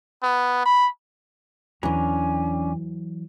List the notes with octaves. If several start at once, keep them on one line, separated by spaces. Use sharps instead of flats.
B3
B5
E2 E3 F#3 C#4 D4 G#5 A#5